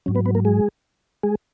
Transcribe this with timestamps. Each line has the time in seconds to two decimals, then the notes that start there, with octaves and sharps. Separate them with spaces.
0.06 G#2 F#3 C#4
0.15 B3 B4
0.25 B3 B4
0.35 A#3 A#4
0.45 G#3 G#4
1.23 G#3 G#4